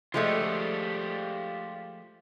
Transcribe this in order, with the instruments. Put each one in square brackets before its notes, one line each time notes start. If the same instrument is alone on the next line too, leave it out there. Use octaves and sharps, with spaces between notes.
[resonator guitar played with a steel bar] F3 G#3 A3 [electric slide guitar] F4 G4 D5